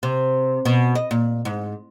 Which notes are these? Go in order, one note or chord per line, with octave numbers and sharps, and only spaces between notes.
C3
B2
D#5
A#2
G#2